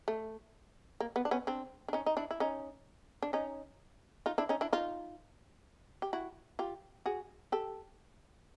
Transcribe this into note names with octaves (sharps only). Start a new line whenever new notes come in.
A3
A#3
B3
D4
B3 C#4
C4 D4
D4
C#4 D#4
D#4
D4 E4
E4
C#4 D#4
D4
C#4 D#4
D#4 F4
D4 E4
C#4 D#4
D4 E4
D#4 F4
G4
E4 F#4
F4 G4
F#4 G#4
G4 A4